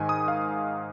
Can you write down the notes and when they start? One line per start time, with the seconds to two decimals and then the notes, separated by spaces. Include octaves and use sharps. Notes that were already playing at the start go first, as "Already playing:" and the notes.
Already playing: G#2 D#3 G#5
0.09 D#6
0.28 F5